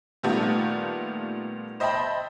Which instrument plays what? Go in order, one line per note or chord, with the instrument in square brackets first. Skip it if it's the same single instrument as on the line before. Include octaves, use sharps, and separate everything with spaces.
[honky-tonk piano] A#2 D#3 G3 A3 B3 F4
C5 D#5 E5 G5 A5 B5